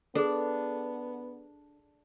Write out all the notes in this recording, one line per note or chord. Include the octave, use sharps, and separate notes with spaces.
B3 D4 G#4 A4